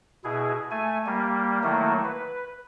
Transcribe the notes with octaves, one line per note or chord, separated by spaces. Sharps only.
B2 E4 G#4
A3 G#5
G3 A#3
D#3 F#3 A3 A#3 E4
B4